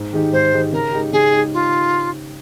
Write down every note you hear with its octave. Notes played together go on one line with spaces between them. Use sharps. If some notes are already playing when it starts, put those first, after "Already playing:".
Already playing: G#2
D#3 G#3 D#4 G4
G#2 C5
D#3 G#3 D#4 G4
C#3 A#4
G#3 D#4 G4
C#3 G#4
G#3 D#4 G4
F4